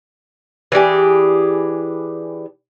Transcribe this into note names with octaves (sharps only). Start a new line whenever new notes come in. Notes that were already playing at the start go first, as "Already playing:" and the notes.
E3 D4 G4 G#4